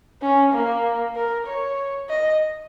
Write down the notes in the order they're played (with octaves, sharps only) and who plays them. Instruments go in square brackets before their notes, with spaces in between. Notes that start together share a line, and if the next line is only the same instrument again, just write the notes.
[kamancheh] C#4
A#3
A#4
C#5
D#5